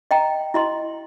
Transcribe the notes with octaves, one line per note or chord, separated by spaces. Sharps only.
D#5 G5 A#5
E4 D#5 C6